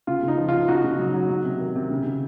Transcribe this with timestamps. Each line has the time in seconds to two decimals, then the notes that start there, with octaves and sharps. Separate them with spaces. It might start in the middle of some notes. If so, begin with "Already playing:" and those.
0.07 C#3 F4
0.23 C#3
0.28 D#4
0.38 F3
0.49 F3 F4
0.68 C#3 D#4 F#4
0.84 C#3
0.99 F#3
1.14 F#3
1.30 F#3
1.45 C3
1.60 D#3
1.76 C3
1.91 C#3
2.06 C#3